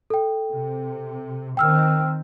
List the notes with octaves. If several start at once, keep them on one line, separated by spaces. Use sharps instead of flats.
A4 G5
C3
D#3 C4 G5 E6 F6